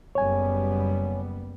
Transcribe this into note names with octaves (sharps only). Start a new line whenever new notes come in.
F#1 G3 B3 C#5 G#5